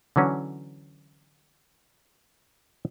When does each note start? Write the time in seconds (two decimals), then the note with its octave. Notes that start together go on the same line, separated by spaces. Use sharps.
0.16 D3 E3 F#3 C#4